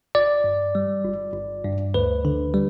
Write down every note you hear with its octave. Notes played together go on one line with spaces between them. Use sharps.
G1 D5
G2
G3
G1
G1
G2
D2 B4
D3
G3